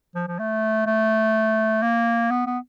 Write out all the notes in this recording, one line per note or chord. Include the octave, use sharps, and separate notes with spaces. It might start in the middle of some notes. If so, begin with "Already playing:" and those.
F3
F3
A3
A3
A#3
B3
B3